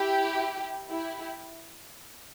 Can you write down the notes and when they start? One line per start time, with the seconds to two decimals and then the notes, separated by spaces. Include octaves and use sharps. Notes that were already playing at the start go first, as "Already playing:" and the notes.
Already playing: E4 G4
0.89 E4 G4